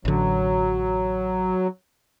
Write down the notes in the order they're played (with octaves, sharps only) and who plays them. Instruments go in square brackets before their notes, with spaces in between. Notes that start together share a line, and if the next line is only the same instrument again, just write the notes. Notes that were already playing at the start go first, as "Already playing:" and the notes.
[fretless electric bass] A1 D3 [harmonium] F#3